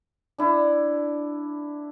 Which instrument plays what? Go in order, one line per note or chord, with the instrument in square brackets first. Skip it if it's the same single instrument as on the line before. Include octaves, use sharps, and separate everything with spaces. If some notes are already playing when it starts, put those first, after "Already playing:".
[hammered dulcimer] D4 E4